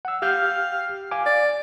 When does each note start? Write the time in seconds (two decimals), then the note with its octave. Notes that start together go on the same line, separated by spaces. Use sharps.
0.05 F#5 E6
0.22 G4 F5 F6 G6
1.11 F5 G#5 D6
1.26 D5